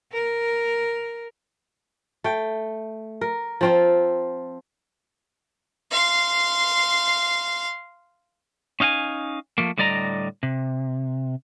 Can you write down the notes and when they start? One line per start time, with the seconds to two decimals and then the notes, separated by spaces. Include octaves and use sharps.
0.12 A#4
2.24 A3 G5
3.21 A#4
3.61 F3 C4 F4
5.91 F5 C6
8.80 C#4 D#4 F5 G5 G#5
9.58 F3 A3 A#3
9.78 A2 D3 G3 D5 D#5 A#5
10.43 C3